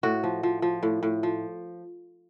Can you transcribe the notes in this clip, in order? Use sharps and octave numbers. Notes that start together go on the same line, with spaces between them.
A2 F#4
F3
F3
F3
A2
A2
F3